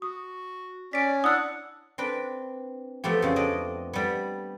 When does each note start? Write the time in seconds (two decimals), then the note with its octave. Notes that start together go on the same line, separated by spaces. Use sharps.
0.02 F#4 D#6
0.93 C#4 D5 B6 D7
1.24 D4 E4 F#5 D#6 E6
1.98 C4 D4 B4
3.04 F3 A3 B3 G4
3.22 F2 C#3
3.36 D4 D#5
3.93 G3 B3